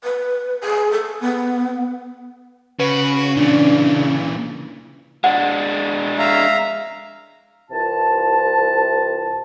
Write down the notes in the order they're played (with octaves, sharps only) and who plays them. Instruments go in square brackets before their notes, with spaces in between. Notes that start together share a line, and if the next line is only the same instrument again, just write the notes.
[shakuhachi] B4
G#4
A4
B3
[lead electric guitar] C#3 [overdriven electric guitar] F#4 [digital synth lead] B4
[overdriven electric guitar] A#2 E3 [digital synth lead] D4
[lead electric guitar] G#3 D4 [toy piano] F#5
[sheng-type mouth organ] E5 F5 A#5
[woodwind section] C2 C3 E3 F4 A5